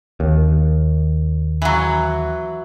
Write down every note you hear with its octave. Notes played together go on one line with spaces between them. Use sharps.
D#2
E3 F#3